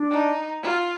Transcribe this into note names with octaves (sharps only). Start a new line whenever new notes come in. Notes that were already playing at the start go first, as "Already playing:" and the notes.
Already playing: D4
D#4
F4